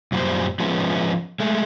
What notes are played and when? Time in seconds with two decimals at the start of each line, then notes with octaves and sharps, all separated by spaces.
0.12 F#2 A#2 G3 F4 C5
0.60 F3 G#3 B3 C#4
1.40 G#3 A3